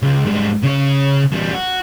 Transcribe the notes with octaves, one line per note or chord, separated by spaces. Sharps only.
C#2
G#2 G3
C#3 C#5
E2 G3
F#4